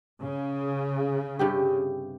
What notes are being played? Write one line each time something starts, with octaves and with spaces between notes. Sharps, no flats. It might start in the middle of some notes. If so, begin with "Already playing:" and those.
C#3
G2 C3 G4